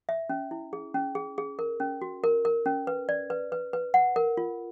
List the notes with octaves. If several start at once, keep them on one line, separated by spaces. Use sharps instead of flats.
E5
C#4
E4
G#4
C#4
G#4
G#4
A#4
C#4
F#4
A#4
A#4
C#4
B4
D5
B4
B4
B4
F#5
A#4
F4